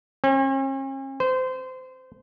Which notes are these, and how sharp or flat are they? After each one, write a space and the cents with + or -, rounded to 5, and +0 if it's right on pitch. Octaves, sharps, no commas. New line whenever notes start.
C#4 -45
C5 -25